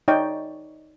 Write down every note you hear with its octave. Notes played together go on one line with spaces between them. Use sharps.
D#4 C#5 D5 G5